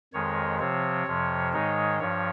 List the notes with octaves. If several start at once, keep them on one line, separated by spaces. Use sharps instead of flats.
F2 D#3 G#3 C#5
C3 F3 C4 C#5
F2 C3 F3
G#2 D#3 G#3 D#4 C#5
G2 F3 C#5